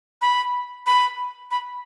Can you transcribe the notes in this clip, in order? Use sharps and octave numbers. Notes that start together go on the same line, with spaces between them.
B5
B5
B5